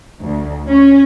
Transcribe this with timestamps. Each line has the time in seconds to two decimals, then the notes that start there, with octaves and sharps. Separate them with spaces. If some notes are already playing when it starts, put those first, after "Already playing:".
0.23 D2
0.68 C#4